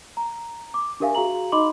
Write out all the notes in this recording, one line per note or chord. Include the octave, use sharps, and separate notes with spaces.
A#5
D6
D4 G4 A#4 E5 F5 G#5
F#4 G#4 F5 A#5 F#7
D#4 D#5 B5 C6 D6 F#7